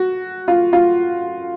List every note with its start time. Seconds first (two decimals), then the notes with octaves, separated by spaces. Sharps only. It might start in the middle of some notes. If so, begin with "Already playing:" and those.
Already playing: F#4
0.48 F4
0.73 F4